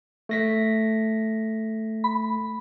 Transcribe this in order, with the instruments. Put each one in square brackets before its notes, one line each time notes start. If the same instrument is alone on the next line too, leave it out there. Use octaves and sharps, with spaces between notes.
[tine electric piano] A3 A#6 B6
[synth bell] B5